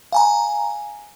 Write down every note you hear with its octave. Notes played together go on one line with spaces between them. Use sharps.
F5 G#5 A#5